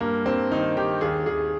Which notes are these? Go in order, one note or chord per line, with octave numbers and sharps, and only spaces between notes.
G2 A#3
G2 C4
D#3 D#4
D#3 G4
D#2 G#4
D#2 G#4